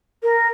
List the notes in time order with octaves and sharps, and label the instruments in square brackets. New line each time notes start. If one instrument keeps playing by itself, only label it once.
[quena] A#4